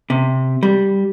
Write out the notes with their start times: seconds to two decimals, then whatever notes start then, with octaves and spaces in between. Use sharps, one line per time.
0.10 C3
0.63 G3